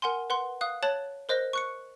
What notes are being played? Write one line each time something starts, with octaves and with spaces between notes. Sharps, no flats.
A#4 F#5 G#5 C6
B4 F#5 C6
F5 D#6 F#6
C#5 A5 F#6 A6 F#7
A#4 C5 D#5 F#6 A#6
C#6 F#6 C#7